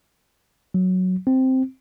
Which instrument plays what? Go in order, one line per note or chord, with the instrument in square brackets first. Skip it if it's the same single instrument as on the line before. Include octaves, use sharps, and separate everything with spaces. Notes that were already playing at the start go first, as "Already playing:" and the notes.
[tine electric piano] F#3
C4